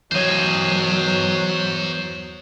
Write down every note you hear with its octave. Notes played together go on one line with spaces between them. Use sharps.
E2 F#3 C5 C#5 D#5